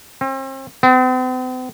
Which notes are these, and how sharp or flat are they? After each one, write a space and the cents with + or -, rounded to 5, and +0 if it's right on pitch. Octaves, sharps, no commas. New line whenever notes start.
C4 +40
C4 -45